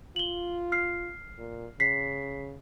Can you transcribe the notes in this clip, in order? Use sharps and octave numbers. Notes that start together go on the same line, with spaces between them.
F4 F#7 G7
F6 C7
A#2
C#3 B6 C7